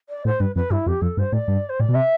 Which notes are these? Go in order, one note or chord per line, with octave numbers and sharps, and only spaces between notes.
D5
A2 C5
G2 B4
F2 B4
G2 E4
F2 G4
F2 A4
G2 C5
A2 D5
G2
C5
A2 D5
B2
C3 E5